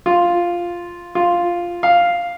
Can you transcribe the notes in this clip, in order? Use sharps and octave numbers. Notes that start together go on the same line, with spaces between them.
F4
F4
F5